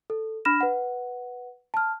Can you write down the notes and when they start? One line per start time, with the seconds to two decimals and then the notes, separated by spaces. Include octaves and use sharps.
0.10 A4
0.45 D4 B5 F6 A#6 E7
0.61 B4 F#5
1.74 A5 F6